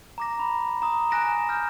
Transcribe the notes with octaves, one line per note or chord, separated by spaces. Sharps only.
A#5 D6 A#6
B5
A#5 D#6
G#5 F#6 A#6 D7 E7
A#5 F6 G6